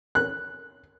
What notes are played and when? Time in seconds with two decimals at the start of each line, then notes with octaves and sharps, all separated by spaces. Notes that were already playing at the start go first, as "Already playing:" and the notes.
0.15 F#6